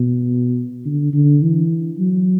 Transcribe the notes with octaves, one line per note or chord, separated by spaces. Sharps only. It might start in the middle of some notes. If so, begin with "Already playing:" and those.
Already playing: B2
D3
D3
E3
F#3